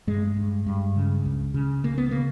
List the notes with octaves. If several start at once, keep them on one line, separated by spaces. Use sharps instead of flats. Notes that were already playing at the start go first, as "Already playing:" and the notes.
G2 G#3
G2
G2
C#3
C#2
C#3
C#3 A#3
B3
C#3 A#3